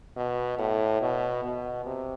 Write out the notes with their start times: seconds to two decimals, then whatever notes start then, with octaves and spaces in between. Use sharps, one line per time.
0.17 B2
0.59 A2
1.01 B2
1.44 B2
1.86 C3